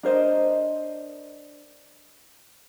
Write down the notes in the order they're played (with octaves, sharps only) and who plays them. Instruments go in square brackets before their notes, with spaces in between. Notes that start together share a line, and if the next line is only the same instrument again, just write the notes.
[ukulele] D4 A#4 C5 D#5